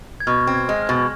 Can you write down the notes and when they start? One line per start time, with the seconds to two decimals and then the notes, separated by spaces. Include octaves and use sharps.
0.20 G#6
0.27 B2 F6
0.47 C4
0.54 G#6
0.69 G#3
0.82 F6
0.89 B2